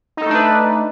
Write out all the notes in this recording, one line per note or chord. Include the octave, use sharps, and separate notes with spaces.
A3 D4 D#4 A4 B4